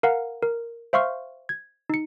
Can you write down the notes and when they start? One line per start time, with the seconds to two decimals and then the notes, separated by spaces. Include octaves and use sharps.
0.03 A#4 F5 F#5 A#5
0.43 A#4
0.93 C5 E5 F5 C6 C#6 F6
1.49 G#6
1.90 D#4 C#7